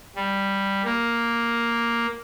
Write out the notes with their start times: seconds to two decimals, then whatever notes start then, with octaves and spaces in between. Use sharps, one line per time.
0.16 G3
0.85 A#3